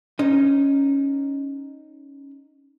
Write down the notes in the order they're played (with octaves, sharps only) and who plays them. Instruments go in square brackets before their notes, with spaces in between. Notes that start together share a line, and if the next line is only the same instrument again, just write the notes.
[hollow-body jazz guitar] C#4 D#4